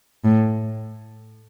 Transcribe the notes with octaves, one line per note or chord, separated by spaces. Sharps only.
A2